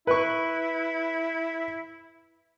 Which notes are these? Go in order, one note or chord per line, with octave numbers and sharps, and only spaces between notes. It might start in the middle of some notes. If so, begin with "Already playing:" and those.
E4 B4 C#6